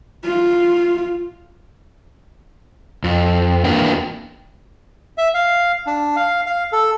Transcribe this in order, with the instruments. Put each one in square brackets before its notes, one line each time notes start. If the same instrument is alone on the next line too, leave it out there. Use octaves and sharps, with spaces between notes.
[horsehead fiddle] F4
[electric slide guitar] F2
E2 A#3 D4 A#4 B4 G5
[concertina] E5
F5
D4
F5
F5
A4